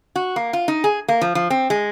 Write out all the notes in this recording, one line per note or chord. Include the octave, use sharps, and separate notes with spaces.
F#4
A#3
F4
D#4
G#4
A#3
F3
F3
C4
G#3